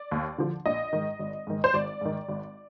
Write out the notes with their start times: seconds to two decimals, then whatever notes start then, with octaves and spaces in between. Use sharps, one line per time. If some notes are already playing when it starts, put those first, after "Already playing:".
Already playing: D5
0.11 D#2
0.38 D3 F3
0.66 A#1 D#5
0.93 G#2 D#3
1.19 G#1
1.47 G#2 D#3
1.64 C5
1.74 G#1 D5
2.01 G#2 D#3
2.29 G#1